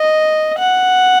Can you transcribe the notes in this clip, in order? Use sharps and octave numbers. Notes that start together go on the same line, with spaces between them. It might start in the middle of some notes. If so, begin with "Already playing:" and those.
Already playing: D#5
F#5